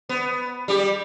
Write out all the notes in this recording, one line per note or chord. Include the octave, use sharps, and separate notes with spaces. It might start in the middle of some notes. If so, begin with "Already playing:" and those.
B3
G3 G4